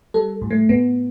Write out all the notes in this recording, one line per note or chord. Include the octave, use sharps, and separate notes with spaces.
G3 A4
A2
A3
A2 B3